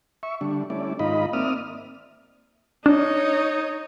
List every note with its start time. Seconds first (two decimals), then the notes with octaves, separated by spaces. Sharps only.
0.23 E5 C#6
0.41 D3 G3 D4
0.70 G3 A3 C#4 E4 D5
0.99 G#2 D#3 D#4 F4 D#5 B5
1.33 A#3 C4 D5 E5 D#6 F6
2.86 D4 D#4 C#5